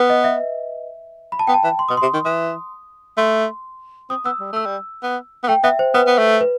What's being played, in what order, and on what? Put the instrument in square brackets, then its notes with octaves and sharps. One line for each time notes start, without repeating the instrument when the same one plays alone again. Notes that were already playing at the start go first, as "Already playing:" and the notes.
Already playing: [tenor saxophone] B3 [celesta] B4
[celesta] D#5
E5
B5
A5
[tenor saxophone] B3 [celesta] G5
[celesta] A5
[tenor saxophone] E3
[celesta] C6
[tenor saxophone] B2 [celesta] D#6
[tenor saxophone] C3 [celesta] C6
[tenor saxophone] D#3
[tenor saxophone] E3 [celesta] D#6
[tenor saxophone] A3 [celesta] C6
[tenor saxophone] C4 [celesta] D#6
[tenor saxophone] B3 [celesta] E6
[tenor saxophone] G3
[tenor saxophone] A3 [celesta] E6
[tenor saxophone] G3
B3
B3
[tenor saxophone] A3 [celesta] G5
[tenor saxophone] B3 [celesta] E5
[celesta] C5
[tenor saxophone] B3 [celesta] B4
[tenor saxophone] B3
A3
[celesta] B4